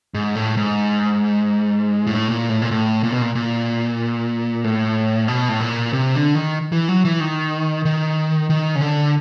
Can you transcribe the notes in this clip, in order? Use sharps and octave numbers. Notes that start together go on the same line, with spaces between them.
G#2
A2
G#2
A2
A#2
A2
A#2
A2
A#2
B2
A#2
A#2
A2
B2
A2
A#2
C3
D3
D#3
E3
F#3
E3
D#3
D#3
D#3
C#3
D3